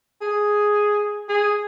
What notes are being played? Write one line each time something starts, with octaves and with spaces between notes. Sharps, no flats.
G#4
G#4